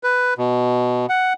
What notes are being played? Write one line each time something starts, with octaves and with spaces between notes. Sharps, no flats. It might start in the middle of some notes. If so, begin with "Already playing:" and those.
B4
B2
F#5